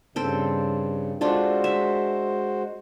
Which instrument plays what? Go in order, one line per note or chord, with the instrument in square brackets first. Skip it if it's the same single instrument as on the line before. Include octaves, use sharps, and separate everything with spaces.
[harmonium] G2 C#3 [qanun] C4 A4 G5
[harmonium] G#3 F#4 C5 [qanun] D4 F4 A4
[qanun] E5